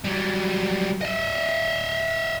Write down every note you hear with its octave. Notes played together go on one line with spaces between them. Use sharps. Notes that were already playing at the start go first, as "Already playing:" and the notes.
F#3 G3
D#5 E5